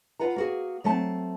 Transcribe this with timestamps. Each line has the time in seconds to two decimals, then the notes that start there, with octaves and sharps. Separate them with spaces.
0.19 F4 B4 F#5 A#5
0.36 A#3 F#4 G#4
0.84 F#3 A3 C4 A5